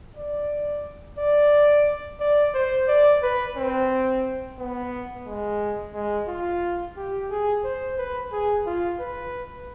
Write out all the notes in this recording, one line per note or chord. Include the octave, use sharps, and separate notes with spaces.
D5
D5
D5
C5
D5
B4
C4
B3
G#3
G#3
F4
G4
G#4
C5
B4
G#4
F4
B4